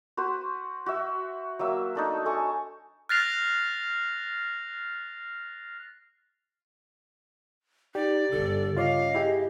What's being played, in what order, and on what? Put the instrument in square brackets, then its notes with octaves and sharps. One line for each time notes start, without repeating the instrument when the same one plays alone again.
[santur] F#4 B4 C5
F#4 E5
F#3 A#3 E5
A3 D4 D#4
A4 G#5 C#6 D#6
[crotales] F6 F#6 A6 A#6 C7 F7
[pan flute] D#4 [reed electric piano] G4 [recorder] D5
[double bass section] G1 G2 D3 [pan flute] A4
[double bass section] C#3 [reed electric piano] F4 C#5 D6 [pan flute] D#5 [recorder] F5
[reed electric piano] E4 G4 G#4